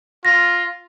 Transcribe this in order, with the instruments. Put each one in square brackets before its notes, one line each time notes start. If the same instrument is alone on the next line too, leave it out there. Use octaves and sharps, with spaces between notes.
[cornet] F4 [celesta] A#6